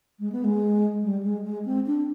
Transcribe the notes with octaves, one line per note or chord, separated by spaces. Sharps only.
G#3
B3
G#3
G3
G#3
G#3
C4
D4